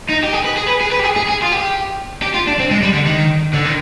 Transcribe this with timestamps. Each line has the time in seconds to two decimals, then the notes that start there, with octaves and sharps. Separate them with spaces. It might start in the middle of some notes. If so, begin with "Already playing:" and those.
0.09 D#4
0.23 G4
0.33 G#4
0.44 B4
0.56 G#4
0.68 B4
0.81 G#4
0.92 B4
1.00 G4
1.04 G#4
1.16 G#4
1.29 G#4
1.42 F4
1.52 G4
2.23 G4
2.34 F4
2.47 D4
2.59 C4
2.71 G#3
2.82 G3
2.94 D3
3.06 D#3
3.54 D3
3.65 D#3